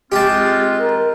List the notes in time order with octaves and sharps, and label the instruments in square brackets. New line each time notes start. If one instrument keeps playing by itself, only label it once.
[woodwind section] G#3 C4 F4 [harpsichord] G4 A5
[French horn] A#4